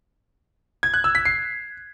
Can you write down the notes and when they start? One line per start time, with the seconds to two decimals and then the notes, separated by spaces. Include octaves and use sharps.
0.83 G#6
0.94 F#6
1.04 E6
1.15 B6
1.25 C7